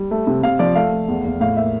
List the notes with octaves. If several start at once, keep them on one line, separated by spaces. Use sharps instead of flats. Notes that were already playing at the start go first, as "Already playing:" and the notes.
Already playing: G3
A3
C3
C3 F5
F3 D5
A3 F5
A3
E2
E2
A2 F5
A#3 E5